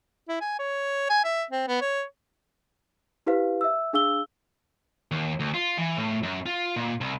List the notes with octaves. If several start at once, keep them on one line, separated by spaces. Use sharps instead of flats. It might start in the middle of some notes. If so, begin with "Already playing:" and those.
E4
G#5
C#5
G#5
E5
C4
B3
C#5
E4 G4 B4 C5 F5
E5 E6
D4 G#4 F5 E6 G7
D#2
D2
F4
E3
A2
F#2
F4
A#2
C2